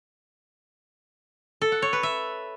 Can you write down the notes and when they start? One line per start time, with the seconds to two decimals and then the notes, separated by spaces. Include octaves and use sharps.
1.61 A4
1.72 F#5
1.82 C#5
1.93 B4
2.03 E5